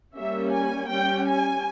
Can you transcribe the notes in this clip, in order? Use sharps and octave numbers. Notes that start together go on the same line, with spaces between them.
G3 A#3 C#4 E5
G#5
G3 C#4 G5
G#5